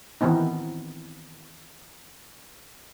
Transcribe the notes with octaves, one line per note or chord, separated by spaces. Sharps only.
D#3 E3 B3 C4 D#4